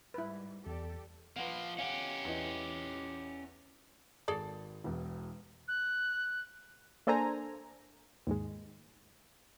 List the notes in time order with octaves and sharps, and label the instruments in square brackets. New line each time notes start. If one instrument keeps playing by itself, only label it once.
[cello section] G#2 G3 [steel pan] E4 B4
[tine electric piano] E2 [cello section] G4 A4 D5
[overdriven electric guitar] F3 A#3 [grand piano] B4 F#5
[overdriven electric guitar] C#4 G4 [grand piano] F5 F#5
[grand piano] E2 E3 D#5
[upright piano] G#1 A6 [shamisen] G#4 A4 D5
[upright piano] E1 E2
[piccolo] F#6
[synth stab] A#3 D4 A4 C5 G#5 A#5
D#2 G#2 G#3